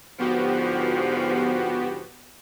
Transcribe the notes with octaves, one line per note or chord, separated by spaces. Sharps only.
G#2 D3 F3 B3 F#4 G4